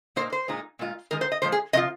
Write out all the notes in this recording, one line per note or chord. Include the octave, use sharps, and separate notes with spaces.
A#2 A#3 D#4 C5
C5
A#2 G#3 D#4
A#2 G#3 F4
D#3 G#3 D#4 A#4
C5
D#5
A#2 F3 G#3 C5
G#4
C3 F3 F4 D#5